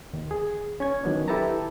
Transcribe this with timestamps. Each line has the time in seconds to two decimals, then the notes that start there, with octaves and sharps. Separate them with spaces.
0.13 D#2 D#3
0.31 G#4
0.80 C#4 C#6 G#6
1.03 D#3 F#3 B3 D4
1.28 E4 G4 A4 B4 A5 A#5